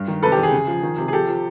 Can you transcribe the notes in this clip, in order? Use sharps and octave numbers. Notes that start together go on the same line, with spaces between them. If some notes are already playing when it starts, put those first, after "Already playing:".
Already playing: G2
D#3
C3 A4 B4
G4
E2
G#4
C#3
F3
D#3
C3
G#4
F3 G4 A4
F3